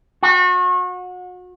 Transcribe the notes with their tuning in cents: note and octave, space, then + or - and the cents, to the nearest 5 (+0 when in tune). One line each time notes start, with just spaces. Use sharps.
F#4 -35